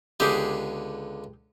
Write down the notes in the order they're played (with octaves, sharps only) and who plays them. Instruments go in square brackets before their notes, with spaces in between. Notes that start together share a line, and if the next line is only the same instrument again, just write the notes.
[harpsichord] C#2 D3 B3 [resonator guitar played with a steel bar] G4 G#4